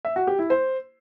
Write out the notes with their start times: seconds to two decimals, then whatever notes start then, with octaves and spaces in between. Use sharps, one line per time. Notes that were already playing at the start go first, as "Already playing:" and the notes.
0.05 E5
0.16 F#4
0.27 G4
0.39 E4
0.50 C5